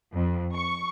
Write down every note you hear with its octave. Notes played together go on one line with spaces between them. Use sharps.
F2
C#6